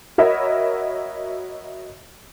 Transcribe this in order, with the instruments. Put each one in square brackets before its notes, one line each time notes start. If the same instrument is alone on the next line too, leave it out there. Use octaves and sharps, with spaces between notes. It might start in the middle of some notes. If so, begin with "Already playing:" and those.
[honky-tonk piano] F#4 A#4 C#5 D#5 E5 B5